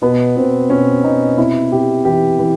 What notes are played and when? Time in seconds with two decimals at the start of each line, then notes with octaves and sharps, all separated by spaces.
0.02 B2 B3
0.36 B2 C4
0.69 B2 C#4
1.03 B2 D#4
1.38 C3 E4
1.72 C3 G4
2.05 E3 G4
2.39 E3